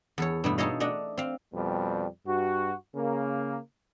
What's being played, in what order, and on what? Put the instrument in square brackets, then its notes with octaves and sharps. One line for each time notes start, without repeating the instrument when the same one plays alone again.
[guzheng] E2 A4 C#5
G2 B2 A3
D#4 G#4 A4 C#5 D#5 F5
A3 D4 D#5 F#5
C4 F5
[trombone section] F2 B2 G3
G2 F#4
C#3 A#3